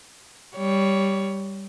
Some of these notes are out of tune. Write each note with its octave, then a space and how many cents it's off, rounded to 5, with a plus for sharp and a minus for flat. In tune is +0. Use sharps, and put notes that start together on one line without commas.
G3 +0 C#5 +15